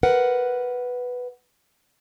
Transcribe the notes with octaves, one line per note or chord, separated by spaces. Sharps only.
A#4 B4 F#5